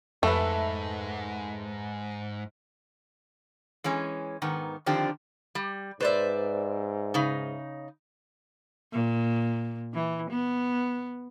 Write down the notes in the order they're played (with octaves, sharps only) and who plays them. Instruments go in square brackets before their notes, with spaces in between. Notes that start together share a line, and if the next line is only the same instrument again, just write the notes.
[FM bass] F2 [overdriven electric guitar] G#2 [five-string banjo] A3 [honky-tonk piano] B4 E5 A5
[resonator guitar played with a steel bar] E3 G#3 C#4
G#2 D#3 B3
D3 D#3 F3 C4 D4 G4
G3
[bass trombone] G#2 [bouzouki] B4 D5 E5 [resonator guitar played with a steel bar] C5
[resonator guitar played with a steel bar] C#3 D#4
[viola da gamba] A#2
E3
B3